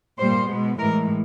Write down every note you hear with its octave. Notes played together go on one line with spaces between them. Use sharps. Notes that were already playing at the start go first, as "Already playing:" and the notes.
A#2 G3 A#3 C5
B2 G#3 B3
A2 E3 G#3 A#4